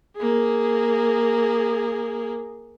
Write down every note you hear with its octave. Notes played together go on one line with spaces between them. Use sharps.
A#3 G#4